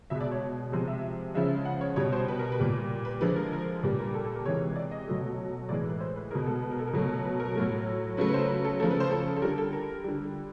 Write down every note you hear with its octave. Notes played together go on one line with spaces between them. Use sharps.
B2 G#3 E5
D5
C#5
C3 F3 G#3 C5
E5
C#3 F3 G#3 E5
F#5
C#5
B2 G3 C#5
C5
B4
A#4
B4
A#2 G3
B4
D3 F3 G#3 B4
A#4
A#4
A#2 G3 B4
A#4
A4
A4
A#4
C3 E3 G#3 C#5
D5
D#5
B2 F#3 A3
A2 E3 G#3 D5
B4
C5
B4
B2 G#3 A#4
A4
B4
A#4
A4
A#4
B2 F#3 A3
B4
A#4
A2 F#3 A3
C#3 F#3 A3 B4
B4
C5
B4
A4
C#3 F3 A3 A4
B4
C5
A4
A4
D3 G3 A#4
A4
A#4
D3 G3